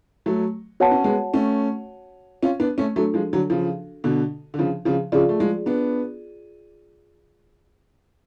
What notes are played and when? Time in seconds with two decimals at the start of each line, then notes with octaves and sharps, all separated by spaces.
0.26 F#3 A3
0.80 B3 F#4 C#5 F#5 A5
0.91 C#4
1.04 G#3 B3
1.34 A3 C#4
2.43 C#4 F4
2.60 B3 D4
2.78 A3 C#4
2.96 F#3 A3 D4 F#4 A4
3.14 F3 G#3
3.33 D3 F#3
3.50 C#3 F3
4.04 B2 D3
4.54 D3
4.59 C#3 F3
4.85 C#3 F3
5.12 C#3 F3 F4 G#4 D5
5.29 A3
5.40 F3 G#3
5.66 B3 D4